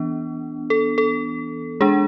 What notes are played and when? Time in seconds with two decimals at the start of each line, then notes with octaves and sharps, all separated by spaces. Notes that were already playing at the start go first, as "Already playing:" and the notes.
Already playing: E3 B3 D4
0.70 A4
0.98 A4
1.80 G#3 D4 G#4